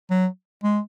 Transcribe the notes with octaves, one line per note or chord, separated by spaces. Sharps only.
F#3
G#3